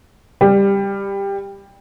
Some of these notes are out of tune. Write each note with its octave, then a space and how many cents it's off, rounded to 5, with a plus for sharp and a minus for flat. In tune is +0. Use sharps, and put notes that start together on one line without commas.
G3 +15